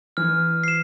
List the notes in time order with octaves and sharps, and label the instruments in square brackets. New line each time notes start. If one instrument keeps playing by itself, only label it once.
[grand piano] E3 [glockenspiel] F6
[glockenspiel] C7 E7